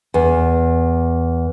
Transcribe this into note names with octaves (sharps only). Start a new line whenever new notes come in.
E2